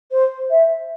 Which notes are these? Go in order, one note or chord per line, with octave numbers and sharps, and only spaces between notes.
C5
E5